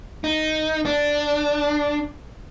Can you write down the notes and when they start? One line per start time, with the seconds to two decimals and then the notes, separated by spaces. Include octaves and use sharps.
0.24 D#4
0.85 D4